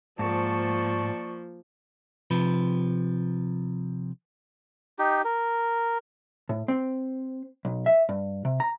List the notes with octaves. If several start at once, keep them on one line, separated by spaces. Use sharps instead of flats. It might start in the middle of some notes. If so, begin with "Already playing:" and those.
G#2 F3 A#3 D5 A5 C#6
C3 F3 B4
D#4 G4
A#4
A2
C4
B1
E5
G2
C3
A#5